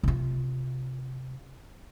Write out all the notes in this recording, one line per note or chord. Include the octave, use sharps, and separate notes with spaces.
C3 F4